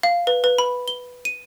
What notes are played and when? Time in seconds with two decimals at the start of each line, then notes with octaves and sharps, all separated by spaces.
0.03 F5
0.27 B4
0.44 B4
0.58 B5
0.88 G7
1.25 D#7